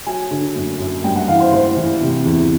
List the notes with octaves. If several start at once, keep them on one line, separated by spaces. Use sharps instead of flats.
F#3 G#5
D3
F#2
F#2
G2 G5
F#5
E3 F5
C5
E3 C5
E3
C3
E2